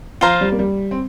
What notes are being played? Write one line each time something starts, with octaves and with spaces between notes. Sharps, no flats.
F3 F4 C5 F5 A#5
G3
A#3
G3
C4